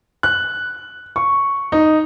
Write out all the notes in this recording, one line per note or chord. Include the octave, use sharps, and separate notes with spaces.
F#6
C#6
D#4